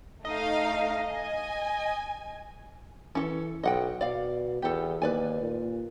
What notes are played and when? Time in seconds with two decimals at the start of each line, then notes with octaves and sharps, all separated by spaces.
0.25 A3 D#4 D#5 F5
1.13 G#5
3.15 E3 C#4 A4
3.63 B1 D#5 F#5 G5
4.01 B2 D5 F5
4.62 E2 G4 A4
5.02 D#2 B4 D5 G#5
5.41 A#2